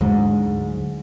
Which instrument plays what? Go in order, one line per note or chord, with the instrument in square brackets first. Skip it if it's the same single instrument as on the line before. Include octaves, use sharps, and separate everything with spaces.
[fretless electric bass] D2 D3 F#3 [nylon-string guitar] G#2